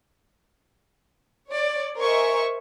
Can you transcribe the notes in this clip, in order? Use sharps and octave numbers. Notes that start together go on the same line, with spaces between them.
C#5 D5
A#4 C5 D#5 E5 G#5 C#6